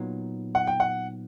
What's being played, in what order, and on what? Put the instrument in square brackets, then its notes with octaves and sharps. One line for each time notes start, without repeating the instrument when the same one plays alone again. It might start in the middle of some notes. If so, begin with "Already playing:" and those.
Already playing: [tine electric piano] A#2 F#3 B3 D#4
[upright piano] F#5
G5
F#5